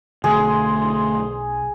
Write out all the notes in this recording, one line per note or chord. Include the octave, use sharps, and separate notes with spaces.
B1 D3 F#3 A3 G#4 C6